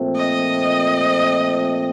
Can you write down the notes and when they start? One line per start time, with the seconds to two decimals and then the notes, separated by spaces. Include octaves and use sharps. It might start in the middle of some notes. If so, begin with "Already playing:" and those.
Already playing: A#2 F3 A3 C4
0.16 D#5